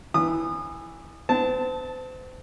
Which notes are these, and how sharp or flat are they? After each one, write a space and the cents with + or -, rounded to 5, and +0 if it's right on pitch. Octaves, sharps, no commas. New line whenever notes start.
E3 +0 D#6 -30
C4 -40 A5 +0